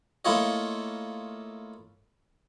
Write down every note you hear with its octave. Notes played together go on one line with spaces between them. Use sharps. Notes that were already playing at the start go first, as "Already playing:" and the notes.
A3 A#3 E4 F4 C#5 D#5